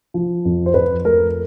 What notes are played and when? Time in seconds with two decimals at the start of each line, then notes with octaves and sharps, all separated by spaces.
0.14 F3
0.45 F2
0.66 C5
0.74 F2 B4
1.05 A3 A#4